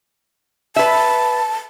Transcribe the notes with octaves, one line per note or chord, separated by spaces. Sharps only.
B4 E5 A5